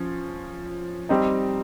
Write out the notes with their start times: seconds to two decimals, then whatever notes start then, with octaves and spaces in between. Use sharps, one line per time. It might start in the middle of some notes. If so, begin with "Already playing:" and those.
Already playing: F3 C#4
1.09 G3 C4 D#4